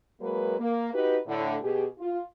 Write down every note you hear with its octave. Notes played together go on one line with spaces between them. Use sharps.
F#3 G#3 A#3 A#4 B4
A#3
D#4 F#4 G4 B4
A2 D3
B2 G4 G#4
F4